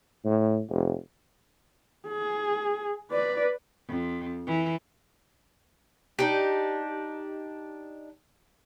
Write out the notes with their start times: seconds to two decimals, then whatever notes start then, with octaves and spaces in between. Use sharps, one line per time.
0.25 A2
0.69 F1
2.08 G#4
3.12 B4 D5
3.88 F2
4.47 E3
6.19 D4 D#4 G4